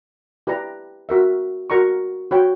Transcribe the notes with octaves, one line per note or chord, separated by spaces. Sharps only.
E4 G4 B4 D5 A#5
F#4 A#4 E5
F#4 A#4 D5 A#5 C#6
F#4 C#5 G5 B5